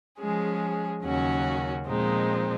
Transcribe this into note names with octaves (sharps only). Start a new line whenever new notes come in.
F3 G#3 C#4 G#4
D#2 C#3 F#3 C#4 F#4
A#2 F3 G#3 C4 D#4